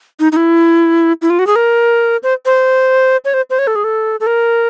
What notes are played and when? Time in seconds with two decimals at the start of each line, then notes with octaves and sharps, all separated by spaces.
0.20 D#4
0.32 D#4
0.36 E4
1.22 E4
1.30 F4
1.39 F#4
1.47 G#4
1.56 A#4
2.23 C5
2.46 C5
3.25 C#5
3.34 C5
3.50 C5
3.59 C#5
3.67 A4
3.76 G#4
3.84 A4
4.20 A4
4.27 A#4